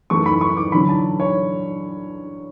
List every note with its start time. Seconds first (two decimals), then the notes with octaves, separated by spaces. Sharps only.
0.10 F#2 E3 A3 C#6
0.26 B5
0.41 C#6
0.57 D6
0.72 E2 D3 F#3 C#4 B5
0.89 A5
1.20 C#5